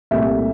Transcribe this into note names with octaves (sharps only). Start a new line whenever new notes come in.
C2 A#2 A3 E5